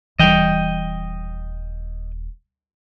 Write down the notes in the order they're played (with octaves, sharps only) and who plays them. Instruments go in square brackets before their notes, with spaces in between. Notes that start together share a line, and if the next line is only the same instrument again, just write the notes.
[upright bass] D#1 [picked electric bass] E3 G3 [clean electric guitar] D#5 G5